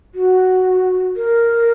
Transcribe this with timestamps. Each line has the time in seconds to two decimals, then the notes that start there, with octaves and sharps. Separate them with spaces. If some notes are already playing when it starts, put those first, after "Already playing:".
0.15 F#4
1.16 A#4